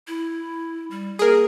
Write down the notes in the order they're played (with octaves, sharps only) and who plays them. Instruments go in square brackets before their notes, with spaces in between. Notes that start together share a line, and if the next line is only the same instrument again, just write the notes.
[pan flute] E4
G3
[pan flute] A#3 [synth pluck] G#4 A#4